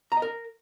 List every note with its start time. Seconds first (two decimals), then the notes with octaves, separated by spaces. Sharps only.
0.12 A#5
0.17 D#5
0.22 A#4